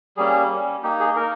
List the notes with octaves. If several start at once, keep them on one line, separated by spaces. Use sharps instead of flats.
G3 A#3 C#4 G#4
G3 A#3 C#4
A#3 D#4 G4
G#4
A#3 D#4 A#4